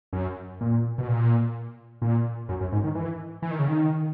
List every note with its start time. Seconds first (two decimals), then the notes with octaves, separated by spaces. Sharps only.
0.13 F#2
0.61 A#2
0.98 B2
1.08 A#2
2.02 A#2
2.49 F#2
2.61 F#2
2.72 G#2
2.84 D#3
2.95 E3
3.42 E3
3.51 D#3
3.59 C#3
3.68 D#3